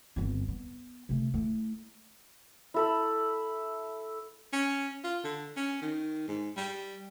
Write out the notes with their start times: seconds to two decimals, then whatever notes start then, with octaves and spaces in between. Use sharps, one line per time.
0.16 G1 C4
0.48 B3
1.09 C3 A3
1.34 A3 E4
2.74 E4 A4 B5
4.53 C#4
5.04 F4
5.24 D3
5.57 C#4
5.82 D#3
6.28 G#2
6.57 G3